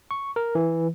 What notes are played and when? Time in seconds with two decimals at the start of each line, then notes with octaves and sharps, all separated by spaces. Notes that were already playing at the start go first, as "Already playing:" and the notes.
0.11 C#6
0.36 A#4
0.55 E3